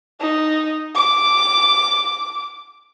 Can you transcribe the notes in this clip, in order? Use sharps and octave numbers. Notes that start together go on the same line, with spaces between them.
D#4
D6